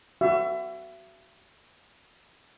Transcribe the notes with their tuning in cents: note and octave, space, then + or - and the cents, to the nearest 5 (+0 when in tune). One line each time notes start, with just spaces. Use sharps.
F#4 +20 E5 +30